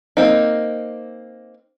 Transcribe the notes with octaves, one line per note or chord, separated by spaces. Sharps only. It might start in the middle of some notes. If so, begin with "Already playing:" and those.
A#3 C4 D#4